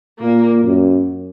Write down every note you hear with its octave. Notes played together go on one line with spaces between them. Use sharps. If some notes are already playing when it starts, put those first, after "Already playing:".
A#2 A#3
F#2